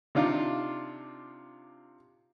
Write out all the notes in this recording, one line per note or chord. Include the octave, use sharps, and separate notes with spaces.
C3 D4 D#4 F4